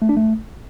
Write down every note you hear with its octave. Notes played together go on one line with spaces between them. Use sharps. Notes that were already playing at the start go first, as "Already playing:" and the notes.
A3
D4
A3